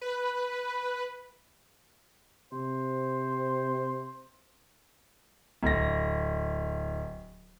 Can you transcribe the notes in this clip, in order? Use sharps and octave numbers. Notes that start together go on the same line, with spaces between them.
B4
C3 C5
D1 A#6